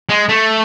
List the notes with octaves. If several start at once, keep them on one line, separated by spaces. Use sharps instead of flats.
G#3
A3